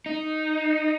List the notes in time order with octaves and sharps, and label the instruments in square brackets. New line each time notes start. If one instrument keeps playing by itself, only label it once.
[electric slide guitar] D#4